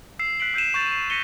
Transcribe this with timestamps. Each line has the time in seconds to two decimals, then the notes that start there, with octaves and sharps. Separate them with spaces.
0.19 E6 C7 E7
0.40 F#6 B6 C7 D7 F#7
0.54 E6 G6 C7 D#7 E7
0.74 C#6 G6 A6 F7
0.92 C7
1.10 A#6 B6 C#7 D#7 G7